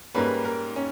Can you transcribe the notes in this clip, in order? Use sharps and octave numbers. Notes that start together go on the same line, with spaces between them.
G#2 G3 A#3 C#4 B4
A#4
C#4